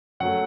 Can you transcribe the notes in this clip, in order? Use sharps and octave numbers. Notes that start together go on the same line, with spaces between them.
F#2 F#3 A3 F#5